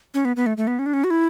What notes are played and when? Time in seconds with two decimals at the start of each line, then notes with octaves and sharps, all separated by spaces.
0.14 C#4
0.25 B3
0.36 B3
0.46 A3
0.57 A3
0.67 B3
0.79 C#4
0.86 D4
0.93 C#4
1.04 F#4
1.10 E4